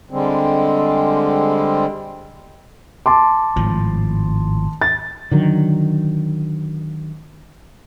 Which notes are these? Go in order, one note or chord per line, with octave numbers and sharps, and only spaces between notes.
D3 G3 G#3 C4
A5 C6 D6
G#1 A2 F3
A6
D3 D#3 F#3